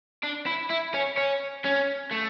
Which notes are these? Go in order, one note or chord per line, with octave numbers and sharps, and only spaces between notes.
D4
E4
E4
C#4
C#4
C#4
A3